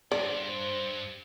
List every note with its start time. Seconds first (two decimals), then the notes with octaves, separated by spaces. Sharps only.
0.12 G2 C5 D5